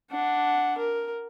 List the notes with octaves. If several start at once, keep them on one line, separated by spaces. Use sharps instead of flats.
D4 F#5
A#4